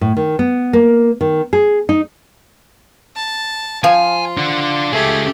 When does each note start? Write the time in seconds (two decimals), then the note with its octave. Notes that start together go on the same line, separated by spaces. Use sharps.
0.01 A2
0.17 D#3
0.39 B3
0.73 A#3
1.21 D#3
1.53 G#4
1.89 D#4
3.16 A5
3.84 F3 F4 G#5
4.38 D4 F#5
4.93 C#2 A3 G4 G#4